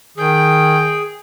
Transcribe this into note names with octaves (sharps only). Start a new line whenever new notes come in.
D#3 G#4 G5